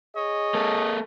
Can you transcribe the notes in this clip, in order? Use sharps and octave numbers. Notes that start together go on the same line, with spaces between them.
G#4 C#5 D#5
A#3 A4